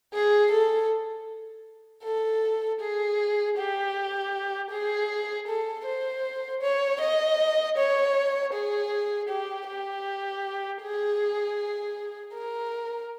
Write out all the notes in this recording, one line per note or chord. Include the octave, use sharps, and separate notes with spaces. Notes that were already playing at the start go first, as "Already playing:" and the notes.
G#4
A4
A4
G#4
G4
G#4
A4
C5
C#5
D#5
C#5
G#4
G4
G4
G#4
A#4